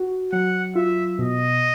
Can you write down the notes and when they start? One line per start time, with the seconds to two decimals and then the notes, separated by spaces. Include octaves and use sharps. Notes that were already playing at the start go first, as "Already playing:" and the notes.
Already playing: F#4
0.32 F#3 F#5
0.75 F4 E5
1.19 B2 D#5